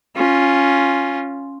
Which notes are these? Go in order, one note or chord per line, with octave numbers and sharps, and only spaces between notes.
C#4 F4